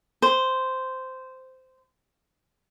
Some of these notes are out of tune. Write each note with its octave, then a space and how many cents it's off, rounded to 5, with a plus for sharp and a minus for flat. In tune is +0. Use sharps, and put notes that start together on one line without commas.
C5 -10